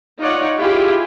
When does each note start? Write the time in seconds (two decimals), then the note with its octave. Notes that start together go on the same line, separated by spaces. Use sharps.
0.20 D#4 F4 C#5 D5 F#5
0.59 E4 F4 G4 G#4